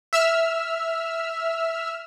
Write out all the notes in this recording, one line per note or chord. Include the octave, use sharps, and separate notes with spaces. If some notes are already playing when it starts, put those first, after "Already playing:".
E5 E6 F6